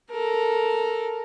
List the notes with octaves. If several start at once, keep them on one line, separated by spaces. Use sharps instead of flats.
A4 A#4